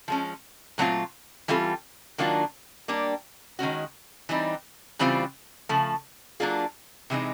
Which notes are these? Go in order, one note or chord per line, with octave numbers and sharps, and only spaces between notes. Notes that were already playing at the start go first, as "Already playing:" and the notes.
F3 G#3 C#4
A#2 F#3 A3 C4 F4
E3 G3 C4 F4 A4
D#3 F#3 A#3 D4 F4
G3 A#3 D4 G4
D#3 G#3 C#4 F#4
E3 G3 C4 D#4
C#3 E3 G3 C4 F4
C#3 F3 A3
F#3 A#3 D4 F4 G#4
C3 E3 G#3 C4 D#4